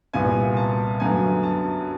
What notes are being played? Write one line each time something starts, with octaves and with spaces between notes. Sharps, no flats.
C2 A#2 G3 B3 G#5
A5
F#2 D3 F#3 B3 G#5
A5